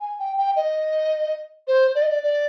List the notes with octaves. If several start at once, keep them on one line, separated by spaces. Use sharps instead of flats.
G#5
G5
G5
D#5
C5
D5
D#5
D5
D5